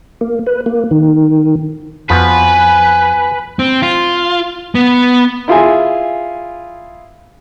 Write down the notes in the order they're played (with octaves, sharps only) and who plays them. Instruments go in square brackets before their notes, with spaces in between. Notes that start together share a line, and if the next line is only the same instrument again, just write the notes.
[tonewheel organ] A#3
B4
A#3
D#3
[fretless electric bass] F2 [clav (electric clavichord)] F3 B3 F#4 [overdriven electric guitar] B4 [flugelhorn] G#5
[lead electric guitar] C4
F4
B3
[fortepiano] E4 F4 G#4 G#5